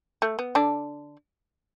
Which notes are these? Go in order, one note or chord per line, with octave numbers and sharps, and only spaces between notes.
A3
B3
D3 D4